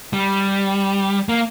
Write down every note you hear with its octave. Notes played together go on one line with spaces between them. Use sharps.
G3
A#3